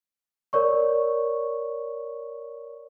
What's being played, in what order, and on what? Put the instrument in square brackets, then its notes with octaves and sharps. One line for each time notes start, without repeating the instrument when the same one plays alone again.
[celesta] A#4 C#5 D5 C#6